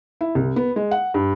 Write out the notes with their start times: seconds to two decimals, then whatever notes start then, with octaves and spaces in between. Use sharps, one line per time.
0.21 E4
0.35 C2
0.56 B3
0.76 G#3
0.91 F#5
1.14 G2